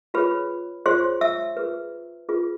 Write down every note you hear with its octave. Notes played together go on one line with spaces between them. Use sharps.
F4 G#4 B4 C#5 B5
F4 G#4 C5 C#5 C6
E5 E6
F4 G#4 B4
F4 G#4 B4